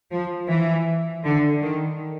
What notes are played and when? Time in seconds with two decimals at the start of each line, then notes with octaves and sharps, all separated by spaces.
0.11 F3
0.49 E3
1.24 D3
1.61 D#3